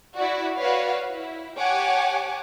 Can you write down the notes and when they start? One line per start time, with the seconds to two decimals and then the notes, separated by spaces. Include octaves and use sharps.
0.16 E4 F#4 D5
0.59 F#4 B4 C#5 D5 F5
1.10 E4
1.58 G4 C#5 F#5 G#5 A5 D6